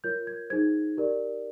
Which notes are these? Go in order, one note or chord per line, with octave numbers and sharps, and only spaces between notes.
F4 A#4 C#5 G6
G#6
D#4 G#4 C5 G#6
G4 A#4 D5